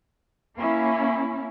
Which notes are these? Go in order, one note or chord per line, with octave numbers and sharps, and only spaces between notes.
A#3 C#4 E4